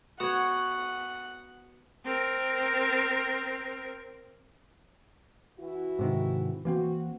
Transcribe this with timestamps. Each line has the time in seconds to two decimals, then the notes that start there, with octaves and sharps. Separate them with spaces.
0.20 B3 F#4 C#5 F#5
2.05 C4 A#4
5.59 E3 E4 F#4
5.99 G#2 C3 D#3
6.65 E3 A#3 C4 F#4